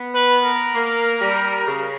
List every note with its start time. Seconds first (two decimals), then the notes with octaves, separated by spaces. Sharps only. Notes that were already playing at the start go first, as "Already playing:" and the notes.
Already playing: B3
0.15 B4
0.44 A#4
0.75 A#3
1.20 G3
1.67 C#3